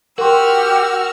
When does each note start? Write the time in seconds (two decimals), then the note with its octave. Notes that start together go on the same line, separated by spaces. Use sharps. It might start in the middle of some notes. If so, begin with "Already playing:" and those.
0.18 F#4 G4 A#4 C6 E6 F6